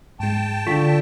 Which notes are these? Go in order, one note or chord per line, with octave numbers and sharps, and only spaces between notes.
G#2 G#3 G5 A5
D3 F4 C#6 B6